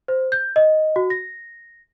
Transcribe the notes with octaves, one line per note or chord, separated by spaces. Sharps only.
C5
G6
D#5
F#4
A#6